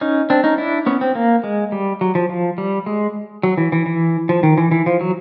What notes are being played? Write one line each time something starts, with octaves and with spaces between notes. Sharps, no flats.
C#4 D#4
C4 D4
C#4 D#4
D4 E4
B3 C#4
C4
A#3
G#3
G3
F#3
F3
F3
G3
G#3
F#3
E3
E3
E3
F3
D#3
E3
E3
F3
F#3